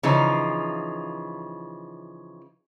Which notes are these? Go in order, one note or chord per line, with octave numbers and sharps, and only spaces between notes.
C#3 E3 F3 D#4